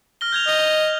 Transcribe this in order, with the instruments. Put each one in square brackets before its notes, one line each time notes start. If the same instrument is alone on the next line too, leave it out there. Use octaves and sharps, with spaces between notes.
[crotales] F6 A#6 G7
G6 G#6 F7
[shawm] D#5